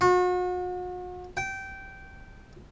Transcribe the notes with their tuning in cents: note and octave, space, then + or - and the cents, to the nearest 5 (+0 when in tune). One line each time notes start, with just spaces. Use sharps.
F#4 -40
G5 -15